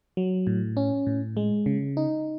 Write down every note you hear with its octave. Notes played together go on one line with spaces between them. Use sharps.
F#3
A2
C#4
A2
G#3
C#3
D#4